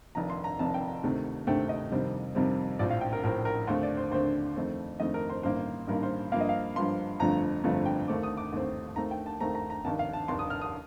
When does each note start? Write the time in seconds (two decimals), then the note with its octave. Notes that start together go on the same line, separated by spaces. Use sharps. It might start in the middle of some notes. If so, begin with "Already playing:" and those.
0.15 F1 F2 D#3 A#5
0.30 C6
0.44 A#5
0.59 F1 F2 D#3 A5
0.74 G5
0.88 A#5
1.03 D2 C3 D#3 A3 C4
1.47 D2 C3 D#3 A3 C4 G5
1.69 D#5
1.91 F2 C3 D#3 G3 C4
2.35 F2 C3 D#3 G3 C4
2.79 A#1 A2 F3 C4 D5
2.90 F5
3.01 G5
3.13 A#4
3.23 A#1 A2 F3 C4 A#4
3.45 A#4
3.67 D#2 D3 A3 C4 C5
3.83 D5
3.97 C5
4.11 D#2 D3 A3 C4 C5
4.56 F2 D#3 A3 C4
5.00 F2 D#3 A3 C4 D#5
5.14 A#4
5.30 C5
5.43 A1 G2 D#3 A#3 C5
5.87 A1 G2 D#3 A#3 A#4
6.03 C5
6.32 G2 F3 A#3 F5
6.41 D#5
6.49 F5
6.76 G2 F3 A#3 C6
7.20 G1 F2 D3 F3 A3 A#5
7.64 G1 F2 D3 F3 A3
7.86 G5
8.08 D#2 D#3 A3 C4 D6
8.23 D#6
8.37 D6
8.52 D#2 D#3 A3 C4
8.96 D#2 D#3 A3 C4 A#5
9.11 G5
9.26 A5
9.40 D#2 D#3 A3 C4 A#5
9.55 A#5
9.70 A#5
9.85 F1 D#2 D#3 A5
9.99 F5
10.13 A5
10.28 F1 D#2 D#3 C6
10.39 D#6
10.50 F6
10.61 D#6